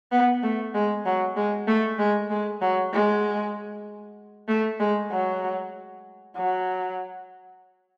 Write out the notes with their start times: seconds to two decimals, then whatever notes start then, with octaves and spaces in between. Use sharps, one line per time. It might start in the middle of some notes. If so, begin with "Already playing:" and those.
0.12 B3
0.43 A3
0.75 G#3
1.06 F#3
1.37 G#3
1.68 A3
1.99 G#3
2.31 G#3
2.62 F#3
2.93 G#3
4.49 A3
4.80 G#3
5.11 F#3
6.37 F#3